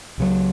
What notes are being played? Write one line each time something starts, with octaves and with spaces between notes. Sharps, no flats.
C#2 C#3 F#3